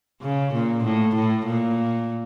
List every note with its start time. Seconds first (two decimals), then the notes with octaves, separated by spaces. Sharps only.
0.22 C#3
0.54 A#2
0.84 A2
1.15 A2
1.46 A#2